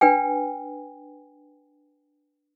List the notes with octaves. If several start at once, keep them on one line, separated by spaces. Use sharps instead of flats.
D4 B4 G5 G#5